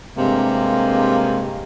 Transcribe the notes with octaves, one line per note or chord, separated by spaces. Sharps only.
G2 C3 G#3 A#3